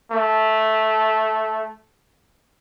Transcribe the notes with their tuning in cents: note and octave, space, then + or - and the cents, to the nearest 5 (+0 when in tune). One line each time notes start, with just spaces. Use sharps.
A3 -10